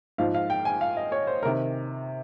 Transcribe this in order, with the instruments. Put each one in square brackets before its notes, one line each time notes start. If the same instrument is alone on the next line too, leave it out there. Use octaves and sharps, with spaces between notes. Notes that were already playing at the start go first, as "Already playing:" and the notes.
[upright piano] G#2 F3 F5
F5
G5
G#5
F5
D#5
C#5
C5
A#4
C3 D#3